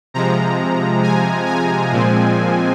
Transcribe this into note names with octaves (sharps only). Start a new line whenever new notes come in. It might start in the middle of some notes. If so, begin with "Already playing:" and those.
C3 F3 G#3 A#5
G#5
G#5
A#2 F3 G#3 C4